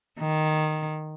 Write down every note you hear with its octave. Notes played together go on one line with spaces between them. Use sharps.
D#3